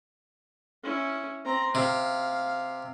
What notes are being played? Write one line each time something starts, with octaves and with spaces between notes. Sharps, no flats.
C#4 E4
C4 A#5
C3 F5